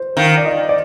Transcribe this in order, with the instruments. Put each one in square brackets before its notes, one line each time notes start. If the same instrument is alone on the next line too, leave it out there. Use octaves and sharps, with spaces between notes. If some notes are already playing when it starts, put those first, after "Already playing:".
Already playing: [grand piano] C5
[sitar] D#3 [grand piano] F5
[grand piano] D5
D#5
D5